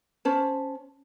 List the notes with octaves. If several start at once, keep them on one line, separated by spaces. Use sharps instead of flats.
C#4 C5 A5